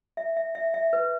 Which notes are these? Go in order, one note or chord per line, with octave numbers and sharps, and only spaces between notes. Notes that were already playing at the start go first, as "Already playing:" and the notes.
E5
E5
E5
E5
B4